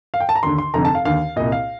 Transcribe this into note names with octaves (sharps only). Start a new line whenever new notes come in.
F5
G5
A5
A#5
D#2 D3 C6
C6
F1 F2 D3 A#5
A5
F5
D#2 D3 F5
C2 A#2 D#5
F5